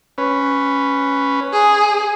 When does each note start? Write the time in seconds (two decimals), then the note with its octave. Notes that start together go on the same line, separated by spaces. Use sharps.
0.18 C#4 B4
1.53 G#4